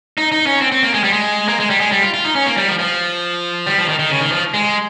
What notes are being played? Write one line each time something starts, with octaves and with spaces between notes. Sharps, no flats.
D#4
D#4
C#4
C4
C4
A#3
G#3
G3
G#3
A#3
G#3
G3
G#3
G3
F4
F4
D#4
C#4
A#3
G3
F3
F3
G3
F3
D#3
D#3
C#3
D#3
F3
G#3